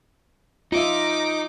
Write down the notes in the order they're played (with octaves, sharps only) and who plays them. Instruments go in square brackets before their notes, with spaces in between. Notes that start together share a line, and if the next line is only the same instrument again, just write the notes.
[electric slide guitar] D#4 [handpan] F4 E5 [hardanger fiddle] D6